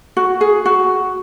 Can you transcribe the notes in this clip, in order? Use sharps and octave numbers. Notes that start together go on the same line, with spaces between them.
F#4
G#4
F#4